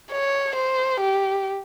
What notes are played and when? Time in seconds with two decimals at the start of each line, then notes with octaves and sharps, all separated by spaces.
0.12 C#5
0.56 C5
1.01 G4